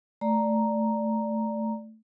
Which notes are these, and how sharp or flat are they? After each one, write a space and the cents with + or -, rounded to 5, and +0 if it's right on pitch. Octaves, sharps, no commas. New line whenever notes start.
A3 +0 D5 +0 A#5 +0